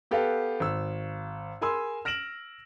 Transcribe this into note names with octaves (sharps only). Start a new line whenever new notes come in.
B3 G4 A4 B4 F5
G#1 E6
G#4 A#4 G#5 B5 C6 E6
F6 A#6 D7 E7 F#7